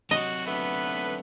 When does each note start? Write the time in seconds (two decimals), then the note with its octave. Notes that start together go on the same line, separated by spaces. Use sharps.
0.11 C3 F#3 F#4 D#5
0.46 D3 A3 B3 B4